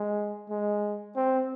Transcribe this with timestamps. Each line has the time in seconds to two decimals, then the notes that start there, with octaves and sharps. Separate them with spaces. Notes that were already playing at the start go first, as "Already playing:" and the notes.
Already playing: G#3
0.49 G#3
1.16 C4